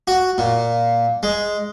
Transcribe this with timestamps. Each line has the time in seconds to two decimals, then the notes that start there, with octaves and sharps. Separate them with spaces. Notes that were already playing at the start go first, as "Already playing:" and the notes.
0.08 F#4
0.38 A#2
1.23 G#3